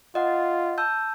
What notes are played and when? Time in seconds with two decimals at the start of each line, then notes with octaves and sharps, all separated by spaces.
0.15 F4 D#5 F#5
0.78 A5 E6 G6